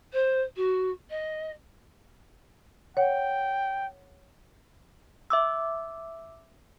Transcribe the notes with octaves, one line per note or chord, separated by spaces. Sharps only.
C5
F#4
D#5
C#5 F#5 G5
E5 D6 E6